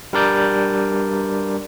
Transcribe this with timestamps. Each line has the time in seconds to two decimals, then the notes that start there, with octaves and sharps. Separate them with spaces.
0.13 G3 D4 A#4 D5 G6